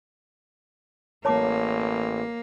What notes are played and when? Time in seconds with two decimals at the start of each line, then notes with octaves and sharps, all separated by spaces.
1.25 A1 A#3 C#5 A5 D6